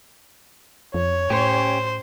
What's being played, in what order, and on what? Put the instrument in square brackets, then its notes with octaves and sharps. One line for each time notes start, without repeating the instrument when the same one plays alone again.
[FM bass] F2 [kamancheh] C#5
[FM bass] A2 [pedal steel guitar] C#4 G4 [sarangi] C5